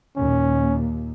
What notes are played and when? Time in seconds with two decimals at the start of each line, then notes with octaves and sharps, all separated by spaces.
0.16 D#2 A#2 C#4